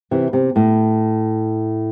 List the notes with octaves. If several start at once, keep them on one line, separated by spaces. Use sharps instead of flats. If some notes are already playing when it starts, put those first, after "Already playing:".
C3 E3
C3
A2